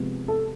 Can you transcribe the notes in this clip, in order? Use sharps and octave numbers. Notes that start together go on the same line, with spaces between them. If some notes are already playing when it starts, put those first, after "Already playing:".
Already playing: C3 F3 G#3 B3
A4